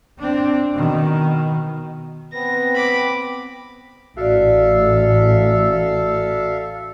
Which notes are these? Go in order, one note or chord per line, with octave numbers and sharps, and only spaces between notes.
C4 D4
B2 D#3
B3 C4 B4 A#6
B5 D6
A1 F#4 A4 D5 E5 F5